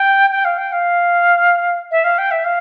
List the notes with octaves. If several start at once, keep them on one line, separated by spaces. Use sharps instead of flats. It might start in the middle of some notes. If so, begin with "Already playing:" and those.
Already playing: G5
G5
F5
G5
F5
E5
F5
G5
E5
F5